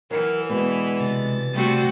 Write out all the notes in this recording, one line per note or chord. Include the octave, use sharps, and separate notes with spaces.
E3 F#3 A#4
B2 D3 G#3 B3
C3 A6
G3 A3 C4 F#4